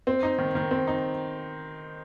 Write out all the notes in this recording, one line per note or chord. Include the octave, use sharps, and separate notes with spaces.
C4
D#4
D#3
D#3
C4
D#4